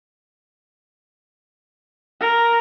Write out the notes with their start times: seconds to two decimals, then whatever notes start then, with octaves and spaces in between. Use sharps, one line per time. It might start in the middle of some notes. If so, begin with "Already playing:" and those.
2.20 A#4